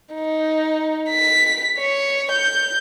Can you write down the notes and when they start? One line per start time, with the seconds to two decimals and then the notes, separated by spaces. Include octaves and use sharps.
0.13 D#4
1.10 B6
1.79 C#5
2.32 G6